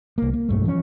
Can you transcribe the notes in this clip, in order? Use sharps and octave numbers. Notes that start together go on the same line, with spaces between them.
C2 A#3
A#3
B1 G2 A3
E3 F3 B3 C#4